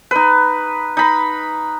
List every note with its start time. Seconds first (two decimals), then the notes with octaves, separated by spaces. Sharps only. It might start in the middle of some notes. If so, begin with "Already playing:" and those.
0.11 D#4 B4
0.97 D#4 B5